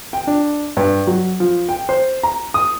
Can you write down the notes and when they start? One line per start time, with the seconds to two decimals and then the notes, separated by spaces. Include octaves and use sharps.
0.13 G5
0.27 D4
0.77 G2
1.07 F#3
1.40 F3
1.69 G5
1.89 C5
2.23 A#5
2.54 D#6